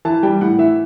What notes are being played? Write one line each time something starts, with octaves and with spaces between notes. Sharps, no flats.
E3 A5
G3 G5
A2 F#5
E3 E5